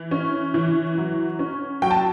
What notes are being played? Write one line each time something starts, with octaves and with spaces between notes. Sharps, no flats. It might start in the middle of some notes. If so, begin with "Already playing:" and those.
Already playing: E3
C#4
E3
F#3
C#4
F#3 G5
A5